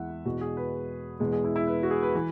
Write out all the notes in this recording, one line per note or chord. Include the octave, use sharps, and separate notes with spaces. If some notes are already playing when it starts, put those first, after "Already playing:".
Already playing: E2 E3 G#3 E4 E5 F#5
E4
E2 B2 G#3 F#4
G#4
B4
E2 B2 G#3 G#4
G#4
E4
E4
B4
F#4
G#4
B4
E3